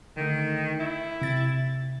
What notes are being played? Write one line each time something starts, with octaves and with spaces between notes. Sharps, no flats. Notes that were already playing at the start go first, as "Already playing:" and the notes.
D3 D#3 A3
E4
C3 A6